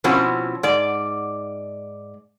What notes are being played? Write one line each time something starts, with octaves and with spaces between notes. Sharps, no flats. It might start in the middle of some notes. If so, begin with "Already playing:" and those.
B2 F3 C4 C#4 E4 F#4
G#2 D5